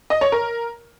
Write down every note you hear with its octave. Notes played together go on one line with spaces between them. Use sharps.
D#5
C#5
A#4